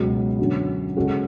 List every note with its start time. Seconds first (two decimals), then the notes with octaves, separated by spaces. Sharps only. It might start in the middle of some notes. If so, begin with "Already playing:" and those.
Already playing: C#2 B2 F#3
0.39 F#2 D3 F#3 C#4 F#4
0.96 C#3 G#3 C#4 F#4 A4